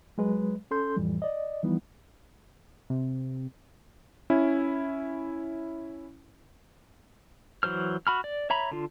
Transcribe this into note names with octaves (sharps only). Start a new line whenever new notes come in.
F#3 G#3 B4
C#4 A4 C6 G6
F2 A2 E3 G3
D5 D#5
E3 F3 G3 B3 D#4 E4
C3
C#4 E4
E3 F#3 C5 F6
F#4 B5 F6
D5
C#5 E5 A#5 B5
D3 F4